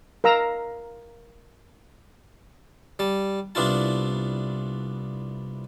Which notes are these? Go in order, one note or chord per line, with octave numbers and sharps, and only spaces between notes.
A#4 F5 A#5 E6
G3 A5
C2 B3 D4 E4 F4 A5